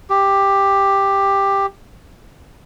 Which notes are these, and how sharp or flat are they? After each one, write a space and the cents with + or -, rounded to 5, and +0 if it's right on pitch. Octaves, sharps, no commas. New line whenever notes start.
G4 +10